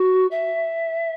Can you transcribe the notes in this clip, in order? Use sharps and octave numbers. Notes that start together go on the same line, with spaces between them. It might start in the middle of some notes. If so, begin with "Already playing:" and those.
Already playing: F#4
E5